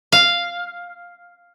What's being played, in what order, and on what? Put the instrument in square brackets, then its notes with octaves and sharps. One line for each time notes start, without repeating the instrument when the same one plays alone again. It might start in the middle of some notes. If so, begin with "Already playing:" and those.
[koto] F5